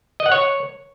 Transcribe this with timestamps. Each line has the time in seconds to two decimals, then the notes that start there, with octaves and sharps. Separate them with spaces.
0.20 D#5
0.26 F#5
0.32 C#5